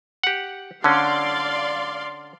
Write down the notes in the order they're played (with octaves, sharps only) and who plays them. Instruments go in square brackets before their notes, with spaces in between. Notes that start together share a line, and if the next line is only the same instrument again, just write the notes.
[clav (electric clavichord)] G4 F#5
[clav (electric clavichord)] D3 C#4 [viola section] D5 F5 C6